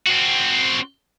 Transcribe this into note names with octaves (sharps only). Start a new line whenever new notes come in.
C4 F#4